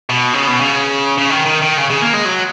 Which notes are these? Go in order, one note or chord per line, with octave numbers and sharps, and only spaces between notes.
B2
C#3
B2
C#3
C#3
D#3
D#3
D#3
C#3
C#3
A#3
G#3
F#3